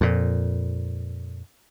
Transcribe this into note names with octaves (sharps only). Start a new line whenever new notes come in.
F2 A#2